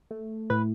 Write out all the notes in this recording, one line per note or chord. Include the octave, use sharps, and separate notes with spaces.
A3
A2 B4